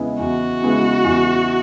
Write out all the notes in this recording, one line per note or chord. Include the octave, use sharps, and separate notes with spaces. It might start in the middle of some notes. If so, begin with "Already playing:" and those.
Already playing: E2 C#3 G#3 B3 E4
E2 F#4
C#3 G#3 B3 E4
E2